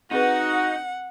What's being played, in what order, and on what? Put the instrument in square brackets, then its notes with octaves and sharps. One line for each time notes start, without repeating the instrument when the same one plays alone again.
[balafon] C4 G#4 B4 [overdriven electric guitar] D#4 [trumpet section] F#4 [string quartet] F#5